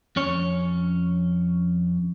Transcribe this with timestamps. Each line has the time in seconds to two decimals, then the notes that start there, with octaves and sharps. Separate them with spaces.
0.16 F2 C#4 C#5